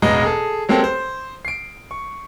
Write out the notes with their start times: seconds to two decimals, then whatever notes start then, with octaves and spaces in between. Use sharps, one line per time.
0.02 E1 A1 G#3 B3 D#5 A#5
0.23 G#4 A4
0.69 F#3 G#3 A#3 C4 G4 A4
0.84 C5
1.45 C7 D7
1.91 C#6